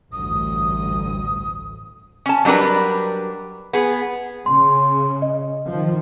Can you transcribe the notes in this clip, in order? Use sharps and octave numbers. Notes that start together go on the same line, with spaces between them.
A1 D2 G2 D#6
C#4 A5
F#3 G3 D4 A#4 B4
B3 G#4
C#3 C6
D#5
D#3 F3